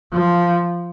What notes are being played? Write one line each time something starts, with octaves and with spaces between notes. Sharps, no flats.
F3